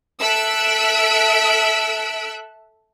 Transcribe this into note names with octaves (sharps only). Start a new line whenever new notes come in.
A4 E5 E6 F#6 B6 D7